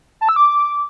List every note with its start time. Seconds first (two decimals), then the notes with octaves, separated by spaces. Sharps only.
0.21 A5
0.29 E6
0.36 D6